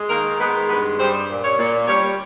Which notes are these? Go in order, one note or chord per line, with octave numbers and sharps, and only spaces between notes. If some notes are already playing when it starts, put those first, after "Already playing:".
Already playing: G#3
D#3 A#3 A#4
G#3 B3 B4
G2 B3 B4
G3 C4 C5
A#2
C#4 C#5
A#2
G3 C#4 C#5